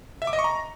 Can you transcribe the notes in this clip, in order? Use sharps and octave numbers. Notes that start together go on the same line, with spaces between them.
E5
D6
D#5
C#6
A#5